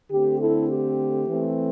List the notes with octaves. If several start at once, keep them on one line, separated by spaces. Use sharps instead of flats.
D3 A3 C4 G4
E4 A4
G4
E3 A3 C4